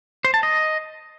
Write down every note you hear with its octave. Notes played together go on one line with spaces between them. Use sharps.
C5
A5
D#5